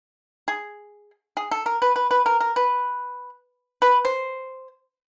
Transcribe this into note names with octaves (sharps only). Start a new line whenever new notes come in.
G#4
G#4
A4
A#4
B4
B4
B4
A#4
A#4
B4
B4
C5